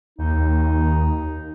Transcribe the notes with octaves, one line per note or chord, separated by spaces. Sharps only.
D#2 D#4